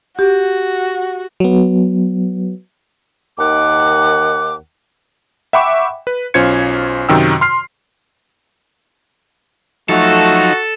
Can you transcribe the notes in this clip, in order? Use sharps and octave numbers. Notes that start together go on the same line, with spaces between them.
F#4 G4
F#3 B3
D#2 D#3 F#5 D6
E5 F#5 G5 B5 C#6 D6
B4
B1 C#4 F4 C5 G#6 C#7
F#2 C3 D#3 F#4 G5 E6
C6 F6 C7
F3 F#3 A3 D#4 F#4 A4